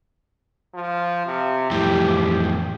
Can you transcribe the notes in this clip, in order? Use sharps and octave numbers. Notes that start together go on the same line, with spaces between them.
F3
C3
F2 A2 E3 G4